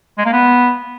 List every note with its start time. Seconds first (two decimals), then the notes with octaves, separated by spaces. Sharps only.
0.18 G#3
0.25 A#3
0.33 B3